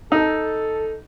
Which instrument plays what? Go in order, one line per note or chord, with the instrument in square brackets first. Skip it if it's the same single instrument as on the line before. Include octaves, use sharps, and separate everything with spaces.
[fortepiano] D#4 [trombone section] A4